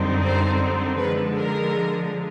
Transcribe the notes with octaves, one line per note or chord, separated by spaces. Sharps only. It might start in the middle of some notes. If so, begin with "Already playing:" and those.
Already playing: F#2 D3 G3 C4 D#4
C5
D3 F3 G#3 B4
A#4